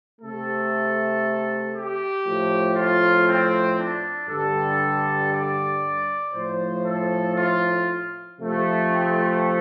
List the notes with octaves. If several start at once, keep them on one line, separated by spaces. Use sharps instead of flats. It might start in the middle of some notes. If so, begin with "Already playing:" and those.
A3 A4
C3
G4
A2 F3 A3
F4
C4
D4
G2 D3 G3 A4
D5
A2 F3 A3 C5
A4
F4
C3 F3 A3
C4